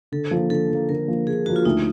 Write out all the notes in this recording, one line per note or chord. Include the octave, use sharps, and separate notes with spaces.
D3 A4
F3 A#3
D3 A4
F3 A#3
D3 A#4
F3 A#3
D3 G#4
F3 A#3 F#4
F4
D2 D#4